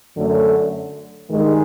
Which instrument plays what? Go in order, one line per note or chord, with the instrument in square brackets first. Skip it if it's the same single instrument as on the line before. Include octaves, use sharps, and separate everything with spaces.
[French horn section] F#2 D3 F#3 A3
G2 D#3 G#3